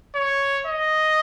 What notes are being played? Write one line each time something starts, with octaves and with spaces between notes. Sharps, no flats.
C#5
D#5